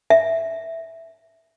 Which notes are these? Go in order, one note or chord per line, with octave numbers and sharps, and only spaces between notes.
E5